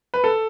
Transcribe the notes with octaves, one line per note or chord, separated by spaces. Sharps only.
B4
A4